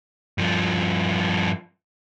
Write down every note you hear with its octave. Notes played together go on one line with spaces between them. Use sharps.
G2 F3